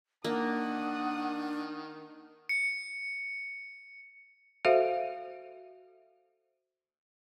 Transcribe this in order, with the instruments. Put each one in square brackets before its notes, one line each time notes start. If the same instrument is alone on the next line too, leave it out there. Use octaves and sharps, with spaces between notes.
[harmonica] D#3 [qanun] A#3 [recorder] D4 [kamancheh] F#5 D#6
[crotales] C#7
[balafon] F#4 A4 C5 E5 F5